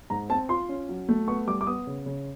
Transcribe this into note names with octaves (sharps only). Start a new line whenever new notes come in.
G#2 A#5
C4 A5
F4 C6
C#4
F#3
A3
B3 C#6
G3 D6
D6
B3 D#6
C#3
C#3